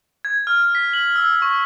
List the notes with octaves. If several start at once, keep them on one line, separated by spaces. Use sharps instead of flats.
G#6
F6
B6
F#7
E6
C#6